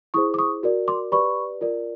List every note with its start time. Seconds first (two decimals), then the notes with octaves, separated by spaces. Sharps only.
0.14 E4 G#4 C5 C#6 D#6
0.34 D6
0.38 C#6 D#6
0.63 F#4 A#4 D5
0.88 C6 D6
1.12 G4 B4 D5 B5 C#6
1.61 F4 A#4 D5